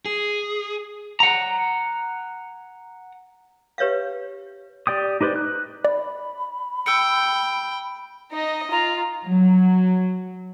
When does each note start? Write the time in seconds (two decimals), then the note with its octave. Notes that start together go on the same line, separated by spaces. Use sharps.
0.05 G#4
1.20 F#5 A#5
3.78 G4 B4 C#5 E5 F5
4.87 G4 D5 G5 D#6
5.21 D#4 G4 B4 C5 D5
5.36 F#6
5.85 D5 B5
6.86 G5 E6 C#7
8.32 D#4 D#5
8.71 F4 A#5
9.26 F#3